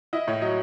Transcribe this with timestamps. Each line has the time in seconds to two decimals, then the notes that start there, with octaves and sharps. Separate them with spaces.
0.13 E4 D#5
0.27 A2 C#5
0.42 F#3 D#5